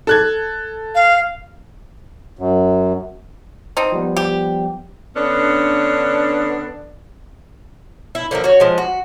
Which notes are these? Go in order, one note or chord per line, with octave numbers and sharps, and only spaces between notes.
A4 F#6 G#6
F5
F#2
C4 D#4
F3 G3 B3
G4
D3 B3 C#4 D4
E4
D3 F3 A#3 E4
F#4 C#5
F3 G#3
F#4